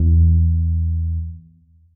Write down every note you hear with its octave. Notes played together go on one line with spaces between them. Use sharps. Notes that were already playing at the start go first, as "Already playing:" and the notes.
Already playing: E2